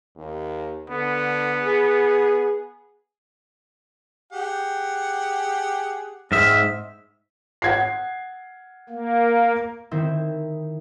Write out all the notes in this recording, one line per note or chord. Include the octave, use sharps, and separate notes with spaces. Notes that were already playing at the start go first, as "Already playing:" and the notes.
D#2
D3 B3
G#4
G4 G#4 F#5
G#2 C4 E5 D#6 F6
F#5 G#6 C7
A#3
D#3 C4 E4